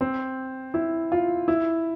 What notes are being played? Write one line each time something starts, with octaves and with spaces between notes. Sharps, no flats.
C4
E4
F4
E4